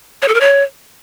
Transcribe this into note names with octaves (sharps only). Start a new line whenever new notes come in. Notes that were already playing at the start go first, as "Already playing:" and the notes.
C#5
A4
A#4
C#5